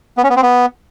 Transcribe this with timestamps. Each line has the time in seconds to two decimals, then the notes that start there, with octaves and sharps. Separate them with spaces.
0.17 B3
0.24 C#4
0.30 B3
0.36 C4
0.42 B3